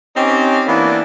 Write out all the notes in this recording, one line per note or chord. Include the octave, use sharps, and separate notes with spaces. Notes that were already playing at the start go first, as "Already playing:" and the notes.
C4 C#4 D#4 G4
E3 A#3 B3 D4